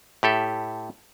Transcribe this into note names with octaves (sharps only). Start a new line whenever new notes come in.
A2 G4 A4 E5